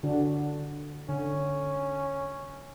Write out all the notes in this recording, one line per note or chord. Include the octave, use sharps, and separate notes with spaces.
D3 D4 F#4
D3 C#4